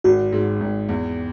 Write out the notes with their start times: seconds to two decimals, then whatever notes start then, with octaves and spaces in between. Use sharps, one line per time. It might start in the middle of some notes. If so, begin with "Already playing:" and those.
0.04 G#1 F#4
0.32 G#2
0.60 G#1
0.89 E2